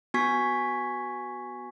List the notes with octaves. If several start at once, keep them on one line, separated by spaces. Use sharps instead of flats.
B3 F#4 G#5 C#6 G#6 B6